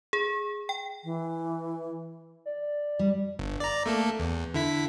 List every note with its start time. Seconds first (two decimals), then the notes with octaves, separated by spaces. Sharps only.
0.13 G#4
0.69 G5
1.04 E3
2.46 D5
2.99 G3
3.39 G1
3.60 D5 A#5
3.86 A3 A#3 A4
4.20 E2
4.54 D3 E4 B6